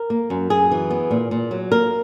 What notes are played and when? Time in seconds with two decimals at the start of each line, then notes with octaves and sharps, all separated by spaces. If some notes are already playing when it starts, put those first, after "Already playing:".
Already playing: A#4
0.10 A#3
0.30 F#2
0.50 F#2 G#4
0.71 E3
0.91 B3
1.11 A#2
1.31 A#2
1.51 F#3
1.72 A#3 A#4